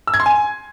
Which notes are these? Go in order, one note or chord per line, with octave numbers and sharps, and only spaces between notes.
E6
G#6
C6
G#5